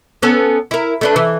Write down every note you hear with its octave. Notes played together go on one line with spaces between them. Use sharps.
B3 C#4 A4
E4 A#4
A3 D4 B4
E3